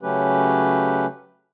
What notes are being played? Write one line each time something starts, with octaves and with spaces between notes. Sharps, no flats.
C#3 F#3 A3 C#4 G4 B4